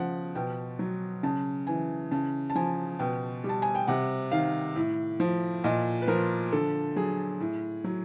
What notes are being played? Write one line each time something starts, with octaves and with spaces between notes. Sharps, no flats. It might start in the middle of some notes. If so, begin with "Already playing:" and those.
Already playing: C#3 F3 F#5
B2 G5
F#3
C#3 A5
E3 G#5
C#3 A5
A5
F3 G#5
B2 G5
G3
A5
G#5
G5
C3 F#5
D#3 F5
A2
F3
A#2 D#5
B4
F3 A#4
D3 A4
F#3 G#4
A2
F#3